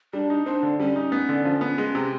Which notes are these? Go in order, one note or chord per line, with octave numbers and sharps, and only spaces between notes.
G3 D4
D#4
C4 D4
D3
G3 C#4
D#4
B3
D3
F3
B3
G#3
C3